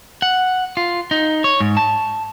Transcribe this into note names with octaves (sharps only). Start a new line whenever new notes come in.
F#5
F4
D#4
C#5
G#2
A5